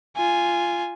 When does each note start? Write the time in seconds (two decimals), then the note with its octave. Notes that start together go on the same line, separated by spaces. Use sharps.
0.17 F4 G#5